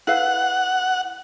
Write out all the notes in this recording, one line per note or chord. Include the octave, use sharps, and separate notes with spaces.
E4 B4 F5 F#5